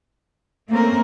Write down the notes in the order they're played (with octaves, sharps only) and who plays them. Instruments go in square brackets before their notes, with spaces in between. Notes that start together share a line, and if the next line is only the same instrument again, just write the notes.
[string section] A3 C4 C#4 [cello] A#3 A#4